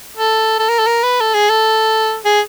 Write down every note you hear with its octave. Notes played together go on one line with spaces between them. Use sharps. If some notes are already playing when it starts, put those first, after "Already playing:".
A4
A4
A#4
A4
A#4
B4
A4
G#4
A4
G#4